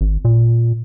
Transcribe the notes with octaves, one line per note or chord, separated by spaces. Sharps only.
G#1
A#2